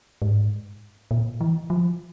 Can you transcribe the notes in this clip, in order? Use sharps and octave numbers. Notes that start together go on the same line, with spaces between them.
G#2
A#2
E3
F3